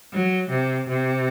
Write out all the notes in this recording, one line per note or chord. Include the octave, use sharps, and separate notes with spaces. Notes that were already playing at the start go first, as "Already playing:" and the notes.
F#3
C3
C3